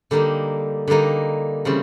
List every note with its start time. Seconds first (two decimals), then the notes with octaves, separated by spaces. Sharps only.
0.11 D3 G3 A#3 D#4
0.88 D3 G3 A#3 D#4
1.65 C#3 E3 G3 C4